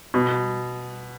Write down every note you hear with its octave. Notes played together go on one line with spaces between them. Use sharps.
B2